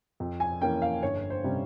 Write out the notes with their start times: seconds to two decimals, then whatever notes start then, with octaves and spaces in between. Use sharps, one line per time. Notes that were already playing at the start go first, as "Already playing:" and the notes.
0.20 F2
0.40 G#5
0.61 E3 A#3 C#4 G5
0.82 F5
1.03 G1 C#5
1.30 C5
1.44 C3 G3 C#4